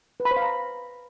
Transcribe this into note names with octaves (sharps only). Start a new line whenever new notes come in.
B4
B5
C5
F5
A#5